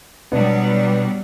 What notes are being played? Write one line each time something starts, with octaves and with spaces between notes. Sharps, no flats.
B2 F#3 G3 B3 D4